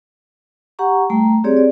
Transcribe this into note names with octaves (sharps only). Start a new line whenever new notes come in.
G4 F#5 A#5 C#6
G3 A3 G5 A#5
C4 G4 G#4 C#5 D5
D5